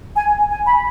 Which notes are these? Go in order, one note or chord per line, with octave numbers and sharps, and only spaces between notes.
G#5
G#5
B5